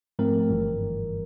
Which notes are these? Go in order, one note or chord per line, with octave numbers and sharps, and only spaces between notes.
G#2 F3 A3 C4 A#4
G1 G2 E3 G3